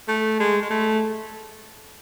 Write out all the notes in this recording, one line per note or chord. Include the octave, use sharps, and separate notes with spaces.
A3
G#3
G#3
A3